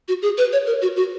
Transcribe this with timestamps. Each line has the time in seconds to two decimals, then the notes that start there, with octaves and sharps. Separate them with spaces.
0.08 F#4
0.22 G#4
0.38 B4
0.52 C#5
0.67 A#4
0.82 F#4
0.96 F#4